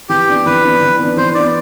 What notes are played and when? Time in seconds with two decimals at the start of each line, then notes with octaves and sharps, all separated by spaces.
0.09 E3 G4
0.28 B3 D4
0.46 E3 B4
0.64 B3 D4
0.81 E3
0.99 B3 D4
1.17 E3 C5
1.35 B3 D4 D5